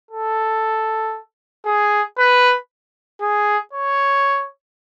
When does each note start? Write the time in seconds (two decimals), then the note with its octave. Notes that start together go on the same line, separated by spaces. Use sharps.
0.11 A4
1.66 G#4
2.18 B4
3.21 G#4
3.73 C#5